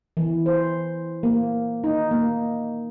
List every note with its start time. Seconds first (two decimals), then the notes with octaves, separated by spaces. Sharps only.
0.17 E3
0.46 C5
1.23 A#3
1.84 D#4
2.11 A#3